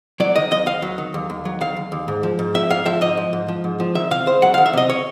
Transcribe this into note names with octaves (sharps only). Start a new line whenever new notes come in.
F#3 D5
D#3 D#5
D#2 D#5
D#2 F5
F#3
D#3
D#2
D#2
F#3
D#3 F5
D#2
D#2
G#2
F3
G#2
F3 E5
G#2 F5
F3 E5
G#2 D#5
F3
G#2
F3
G#2
F3
D#3 E5
C3 F5
C#2 C5
F#3 F#5
D#3 F5
E5
C3 D#5
C#5